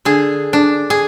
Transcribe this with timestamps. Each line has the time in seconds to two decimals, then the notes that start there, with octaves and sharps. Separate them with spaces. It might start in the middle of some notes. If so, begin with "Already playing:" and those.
0.05 D3 G#4
0.53 D4
0.90 G#4